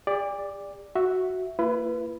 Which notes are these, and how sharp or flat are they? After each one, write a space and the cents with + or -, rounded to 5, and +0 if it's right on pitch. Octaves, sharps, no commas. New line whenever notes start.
G4 +45 D5 +0
F#4 +0 E5 +0
A#3 -30 E4 +45 B4 +0